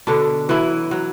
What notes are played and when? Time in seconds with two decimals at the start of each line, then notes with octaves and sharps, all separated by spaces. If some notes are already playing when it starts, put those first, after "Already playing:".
0.07 B2 D3 D4
0.49 E3 F#3 E4
0.91 F#3